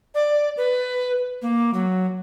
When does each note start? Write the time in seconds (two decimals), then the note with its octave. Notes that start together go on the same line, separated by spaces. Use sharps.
0.15 D5
0.57 B4
1.42 A#3
1.74 F#3